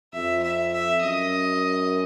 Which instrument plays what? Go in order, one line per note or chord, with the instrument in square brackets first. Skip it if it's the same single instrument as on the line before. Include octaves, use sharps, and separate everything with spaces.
[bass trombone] F2 [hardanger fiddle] E5
[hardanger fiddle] E5
E5
[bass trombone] F#2 [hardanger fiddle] D#5